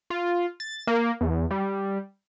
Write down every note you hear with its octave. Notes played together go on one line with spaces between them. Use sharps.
F4
A6
A#3
E2
G3